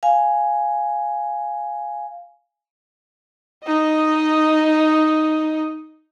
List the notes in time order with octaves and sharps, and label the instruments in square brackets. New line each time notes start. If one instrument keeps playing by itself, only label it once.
[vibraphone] F5 G#5
[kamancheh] D#4 D#5